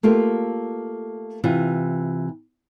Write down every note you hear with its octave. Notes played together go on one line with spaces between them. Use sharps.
A3 A#3 F4 G4 A4
C3 E3 F4